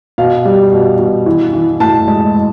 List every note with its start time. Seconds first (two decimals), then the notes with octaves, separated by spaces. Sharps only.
0.18 B2 F5
0.45 G3
0.72 B2
0.99 B2
1.26 E3
1.53 E3
1.80 A2 A5
2.08 G#3